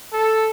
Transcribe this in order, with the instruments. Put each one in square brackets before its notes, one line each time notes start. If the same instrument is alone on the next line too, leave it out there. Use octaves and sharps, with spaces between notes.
[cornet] A4